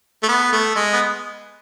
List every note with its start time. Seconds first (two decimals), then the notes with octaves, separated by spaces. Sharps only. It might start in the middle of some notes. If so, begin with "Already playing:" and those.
0.23 A3
0.29 B3
0.52 A3
0.76 G#3
0.93 B3